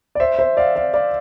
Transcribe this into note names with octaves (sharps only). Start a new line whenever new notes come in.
D5
C5 E5
C5 E5
D5 F5
D5 F5
D5 F5